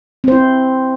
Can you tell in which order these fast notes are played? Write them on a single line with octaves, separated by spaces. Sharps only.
C4 C5 E4